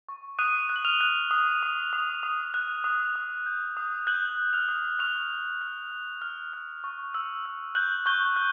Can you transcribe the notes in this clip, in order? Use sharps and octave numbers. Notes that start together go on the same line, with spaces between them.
C#6
D#6 F#6 D#7
F#6
F#7
F6 F7
F#6
D#6
D#6
D#6
D#6
F#6
D#6
D#6
G6
D#6
F#6 G6 F#7
G6
F6 F7
D#6
C#6 F6 F7
F6
F6
F6
F6
F6
C#6
E6
E6
F#6 G6 F#7
C#6 G6 G7
F#6